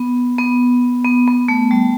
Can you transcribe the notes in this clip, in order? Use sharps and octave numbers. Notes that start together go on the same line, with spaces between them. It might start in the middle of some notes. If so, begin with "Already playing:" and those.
Already playing: B3
B3
B3
B3
A3
G3